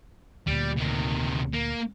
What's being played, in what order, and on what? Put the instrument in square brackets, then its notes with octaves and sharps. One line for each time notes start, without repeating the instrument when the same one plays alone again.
[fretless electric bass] D2 A#2 [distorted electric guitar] G3
[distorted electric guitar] C3 D#3
A#3